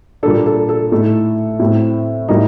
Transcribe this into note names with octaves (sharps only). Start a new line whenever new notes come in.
A#2 G3 A#3 D4 A4
A4
A4
A2 A3 D#4
A2 A3 C4
A2 G3 A#3 D#4